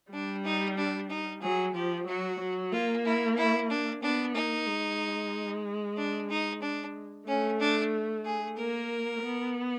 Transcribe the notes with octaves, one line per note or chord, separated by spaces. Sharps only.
G3 D4
D#4
D4
D#4
F#3 G#4
F3 G4
F#3 F#4
F#3
A#3 F4
E4
E4
D4
B3 D4
A#3 D#4
G#3
D4
D#4
D4
A3 C#4
D4
G#4
A#3 A#4
B3